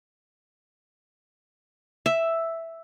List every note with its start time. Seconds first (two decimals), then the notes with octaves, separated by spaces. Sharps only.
2.06 E5